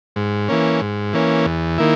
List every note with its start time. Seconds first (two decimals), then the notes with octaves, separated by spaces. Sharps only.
0.16 G#2
0.49 E3 A#3 C#4
0.81 G#2
1.13 E3 A#3 C#4
1.46 E2
1.78 D#3 A#3 E4